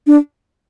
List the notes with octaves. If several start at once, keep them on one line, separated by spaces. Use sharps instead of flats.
D4